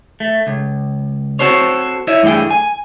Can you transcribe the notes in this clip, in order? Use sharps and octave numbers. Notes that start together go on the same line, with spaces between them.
A3
C#2
C4 F#4 A4 C5 C#5
E4 C#5 D#5 E5
G2 E3 A3 G#4 G5
G#5